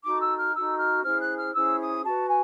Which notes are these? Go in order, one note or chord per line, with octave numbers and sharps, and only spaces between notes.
D#4 F#4 A4 D6
E6
F6
D#4 F#4 A4 E6
F6
C#4 E4 G#4 C5 F6
F#6
F6
C#4 E4 G#4 C5 E6
D#6
F#4 B4 A5
G#5